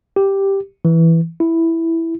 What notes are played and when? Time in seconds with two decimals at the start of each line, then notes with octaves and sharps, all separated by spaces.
0.16 G4
0.85 E3
1.40 E4